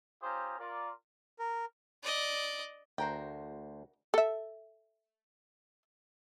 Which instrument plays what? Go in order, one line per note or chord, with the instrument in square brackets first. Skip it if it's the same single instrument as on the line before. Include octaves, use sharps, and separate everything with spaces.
[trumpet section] C#4 F4 G4 C5 A#5 D#6
F4 A#4 D5
[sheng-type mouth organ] A#4
[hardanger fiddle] D5 D#5
[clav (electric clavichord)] D2 C5 [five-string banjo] F#4 A#4 G5
[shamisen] A4 E5